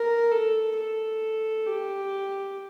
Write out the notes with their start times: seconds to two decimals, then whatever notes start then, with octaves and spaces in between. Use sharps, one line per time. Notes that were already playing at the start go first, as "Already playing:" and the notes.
Already playing: A#4
0.31 A4
0.76 A4
1.66 G4